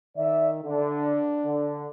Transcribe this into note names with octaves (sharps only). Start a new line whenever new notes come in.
D#3 D5 E5
D3 D4
D3